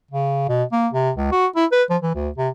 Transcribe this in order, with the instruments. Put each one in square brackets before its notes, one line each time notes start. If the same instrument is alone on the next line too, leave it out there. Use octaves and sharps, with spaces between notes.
[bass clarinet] C#3
B2
A#3
C3
C#2
F#4
E4
B4
F3
E3
D2
C3